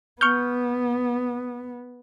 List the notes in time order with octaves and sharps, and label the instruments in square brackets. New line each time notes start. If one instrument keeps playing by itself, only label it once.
[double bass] B3 [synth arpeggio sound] C#6 F6 G6